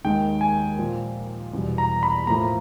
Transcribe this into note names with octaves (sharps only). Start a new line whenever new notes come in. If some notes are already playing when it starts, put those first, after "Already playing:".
D#2 D#3 G#3 G5
G#5
A#2 F3 A#3
E2 B2 G3
A#5
B5
A2 F3 A#3 A#5